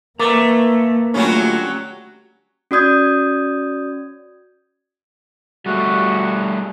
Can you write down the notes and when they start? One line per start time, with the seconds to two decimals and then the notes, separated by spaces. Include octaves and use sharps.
0.19 A3 A#3 A#4 B4 E5 A#5 D6 A6
1.14 D3 F#3 G3 A3 C#4 F4
2.71 C#4 F#4 D5 D#6 G6 G#6
5.66 G3 A3 F#4